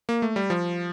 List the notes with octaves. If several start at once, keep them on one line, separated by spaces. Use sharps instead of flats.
A#3
A3
G3
F3